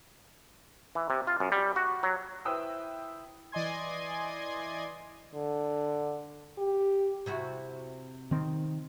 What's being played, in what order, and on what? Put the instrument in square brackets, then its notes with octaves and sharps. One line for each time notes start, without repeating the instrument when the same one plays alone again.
[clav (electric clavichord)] E3
C3
F4
F#2
G3
F#4
F#3
[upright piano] E4 B4 C5 G5 D#6 E6
[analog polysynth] E3 D5 D#5 G#5 C6 G#6
[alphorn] D3
G4
[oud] C3 E4 F#4
[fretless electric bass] D#3 C4